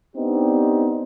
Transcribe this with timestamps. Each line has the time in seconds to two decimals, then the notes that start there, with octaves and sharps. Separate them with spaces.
0.16 B3 C4 D4 D#4 G4